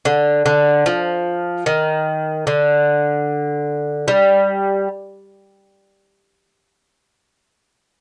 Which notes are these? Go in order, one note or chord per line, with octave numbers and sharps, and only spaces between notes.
D3
D3
F3
D#3
D3
G3